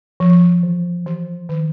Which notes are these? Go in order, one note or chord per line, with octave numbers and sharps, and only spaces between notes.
F3
E3
E3
D#3